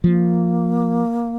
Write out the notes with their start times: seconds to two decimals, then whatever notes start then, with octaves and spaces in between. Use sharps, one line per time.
0.04 F3 A#3